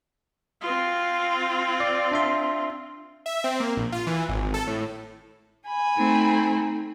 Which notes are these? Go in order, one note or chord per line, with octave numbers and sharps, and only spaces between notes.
C4 F4
D5
D4 E5 C6
E5
C4
A#3
A#1
F4
E3
G#1
A4
A2
G#5 B5
A3 C4 D#4